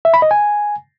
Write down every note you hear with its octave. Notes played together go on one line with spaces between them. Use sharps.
E5
B5
D#5
G#5